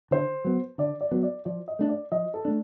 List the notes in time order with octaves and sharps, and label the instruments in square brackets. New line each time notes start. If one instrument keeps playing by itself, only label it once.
[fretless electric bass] D3 [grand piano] C5
[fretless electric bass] F#3 B3
[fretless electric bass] D3 [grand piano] D5
[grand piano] D5
[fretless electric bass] F#3 B3
[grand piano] D5
[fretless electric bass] F3 [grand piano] D5
[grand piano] D#5
[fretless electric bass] A3 D4
[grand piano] D5
[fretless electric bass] F3 [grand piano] D#5
[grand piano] A4
[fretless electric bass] A3 D4